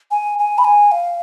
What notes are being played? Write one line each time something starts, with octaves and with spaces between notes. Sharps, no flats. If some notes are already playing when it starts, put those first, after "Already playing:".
G#5
G#5
B5
G#5
F5